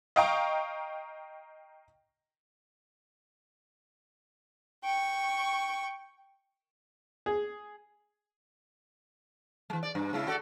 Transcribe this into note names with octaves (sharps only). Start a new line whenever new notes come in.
D#5 F5 G5 A#5 C#6
G5 C#6
G#4
E3 G#3
D5
G2
C#3 G#3 E4
F#4 A4 D5